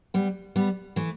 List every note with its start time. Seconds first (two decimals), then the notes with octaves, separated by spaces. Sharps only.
0.14 G3 B3
0.56 G3 B3
0.96 E3 A3